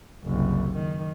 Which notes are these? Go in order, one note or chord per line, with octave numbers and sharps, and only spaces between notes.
F#1 C2
D#3